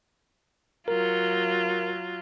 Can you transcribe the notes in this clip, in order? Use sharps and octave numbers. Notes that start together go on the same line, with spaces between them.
F#3 F4 A#4